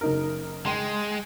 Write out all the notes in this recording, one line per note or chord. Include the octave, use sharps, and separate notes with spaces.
F#1 D#4 A#4
G#3 G5 C6